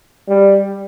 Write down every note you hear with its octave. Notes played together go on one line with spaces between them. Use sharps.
G3